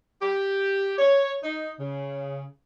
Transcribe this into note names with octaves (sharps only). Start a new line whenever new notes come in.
G4
C#5
D#4
C#3